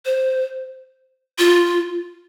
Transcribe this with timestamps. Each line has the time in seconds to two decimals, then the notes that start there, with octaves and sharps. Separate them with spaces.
0.06 C5
1.39 F4